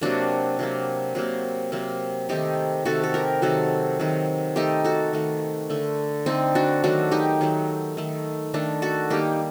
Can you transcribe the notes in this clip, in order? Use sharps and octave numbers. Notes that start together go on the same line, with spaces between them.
C3 F#3 A#3 D4 F#4
C3 F#3 A#3
C3 F#3 A#3
C3 F#3 A#3
C3 D#3 A3 D#4 G4
C3 D#3 A3 F#4 A4
A4
G4 A#4
C3 D#3 F#3 F#4 A4
C3 D#3 F#3
D#3 A3 D#4 G4
F#4 A4
D#3 A3
D3 A3
D3 A3 C4 D#4
D4 F#4
D#3 F#3 A3 D4 F#4
D#4 G4
D#3 F#3 A3
D#3 A3
D#3 A3 D4
F#4 A4
D#3 G3 A#3 D#4 G4